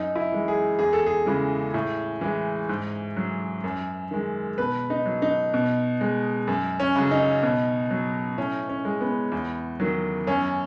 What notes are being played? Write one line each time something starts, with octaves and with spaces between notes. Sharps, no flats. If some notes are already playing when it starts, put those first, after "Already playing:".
Already playing: F#2 D#4
E4
E3 G#3
G#4
E2 G#4
A4
G#4
C#3 E3 G#3
A2
E3 G#3
G#2
F#3
F#2
D#3 G#3
B2 B4
D#4
F#3
D#4
B2
G#3
F#2
C#4
C#3 F#3
D#4
B2
F#3
A2 C#4
C#4
G#3
B3
E2
D#3 F#3
F#2 C#4